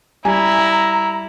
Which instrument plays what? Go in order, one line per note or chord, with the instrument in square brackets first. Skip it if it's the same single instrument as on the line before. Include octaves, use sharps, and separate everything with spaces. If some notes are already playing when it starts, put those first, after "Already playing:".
[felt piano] G3 G#5 [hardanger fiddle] E4 [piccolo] A#5